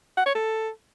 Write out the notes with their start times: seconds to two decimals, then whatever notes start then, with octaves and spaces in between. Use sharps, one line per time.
0.17 F#5
0.26 C#5
0.35 A4